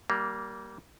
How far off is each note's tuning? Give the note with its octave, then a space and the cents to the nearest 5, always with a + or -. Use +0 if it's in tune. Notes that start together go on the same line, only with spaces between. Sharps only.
G3 -25 A#3 +0